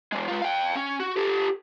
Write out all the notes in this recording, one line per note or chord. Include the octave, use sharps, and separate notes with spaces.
E3 G#3
G#3 F4
F5 G5
C#4
F#4
G4 A4